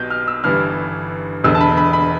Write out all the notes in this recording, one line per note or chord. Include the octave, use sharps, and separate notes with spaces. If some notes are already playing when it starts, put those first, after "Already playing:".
Already playing: B1 B2 G6
F6
E6
G1 G2 E3 F6
E1 E2 D3 E6
A5
B5
B5
B5